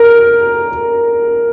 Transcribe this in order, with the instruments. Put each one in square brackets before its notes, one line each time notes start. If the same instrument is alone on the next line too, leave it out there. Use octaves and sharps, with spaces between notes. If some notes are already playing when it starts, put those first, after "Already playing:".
Already playing: [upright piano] A#4